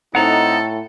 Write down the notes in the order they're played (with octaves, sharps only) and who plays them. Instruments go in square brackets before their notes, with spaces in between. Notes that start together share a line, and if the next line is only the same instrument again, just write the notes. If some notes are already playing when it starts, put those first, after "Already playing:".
[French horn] A2 [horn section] C4 D#4 [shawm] A4 [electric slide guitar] F#5 A#5